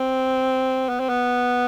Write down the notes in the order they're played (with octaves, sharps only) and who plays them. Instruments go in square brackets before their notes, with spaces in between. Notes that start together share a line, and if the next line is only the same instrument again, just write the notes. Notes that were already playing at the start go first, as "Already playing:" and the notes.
Already playing: [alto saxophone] C4
B3
C4
B3